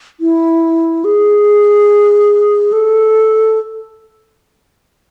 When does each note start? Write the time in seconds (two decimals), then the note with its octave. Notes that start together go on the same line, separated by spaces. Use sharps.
0.20 E4
1.04 G#4
2.72 A4